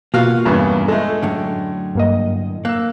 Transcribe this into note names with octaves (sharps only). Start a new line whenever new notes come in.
B2 A#3 F4 F#4 F5
E2 G2 C#3
G#3 A3 A4
F#2 A2 D3
G2 A#3 D#5
A#3 E6 F#6